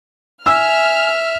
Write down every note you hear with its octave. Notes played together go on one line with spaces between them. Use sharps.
E5 G#5 E6 F6